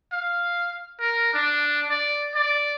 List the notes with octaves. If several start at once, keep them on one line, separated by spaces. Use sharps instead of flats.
F5
A#4
D4
D5
D5